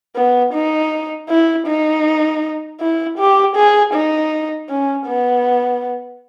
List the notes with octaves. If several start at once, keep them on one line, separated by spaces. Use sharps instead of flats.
B3
D#4
E4
D#4
E4
G4
G#4
D#4
C#4
B3